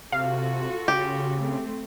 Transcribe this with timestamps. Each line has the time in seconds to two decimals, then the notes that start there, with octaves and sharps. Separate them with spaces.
0.12 C3 F4 F#4 A4 F5
0.88 C#3 G4
1.38 A3 C4